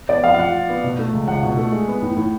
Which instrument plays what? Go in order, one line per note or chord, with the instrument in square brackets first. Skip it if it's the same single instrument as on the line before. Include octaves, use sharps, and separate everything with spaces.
[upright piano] B3 [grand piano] D5
[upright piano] F2 [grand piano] F5
[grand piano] F5
[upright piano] F4 [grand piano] F#5
[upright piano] F3
B3
B2
A3
C#2
[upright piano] C#2 [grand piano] F#5
[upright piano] B2
A3
G#3
B3
A2
A2